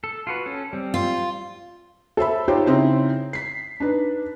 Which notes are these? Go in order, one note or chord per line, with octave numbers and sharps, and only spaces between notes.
A4
F4 F#4 B4
C#4 A4
G3 C4
F4
A4 C5 E5 B5
D#4 F4 G4 C5 C#5
C#3 C4 D#4 E4
B6 C7
D4 D#4 B4